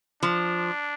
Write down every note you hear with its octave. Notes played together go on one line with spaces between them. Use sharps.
F3 D4